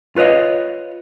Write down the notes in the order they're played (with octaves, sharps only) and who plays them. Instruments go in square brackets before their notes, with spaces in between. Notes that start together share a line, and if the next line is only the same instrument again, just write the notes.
[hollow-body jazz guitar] F4 B4 C#5 D#5 F5